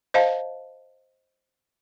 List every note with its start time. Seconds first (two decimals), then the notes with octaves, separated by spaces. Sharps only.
0.14 C5 D#5 F5 A5